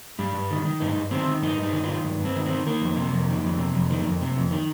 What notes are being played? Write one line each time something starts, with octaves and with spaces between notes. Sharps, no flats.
G2 G3
G2
D#3
D#3
G2 D#4
G2
D#3 C4
D#3
G2 D#4
G2
D#4
D#3
F4
D#3
G2
G2
C4
D#3
C4
D#3
D#3 A#3
F2
C3
F2
D#3
F2
C3
F2
D#3
F2
C3
F2
D#3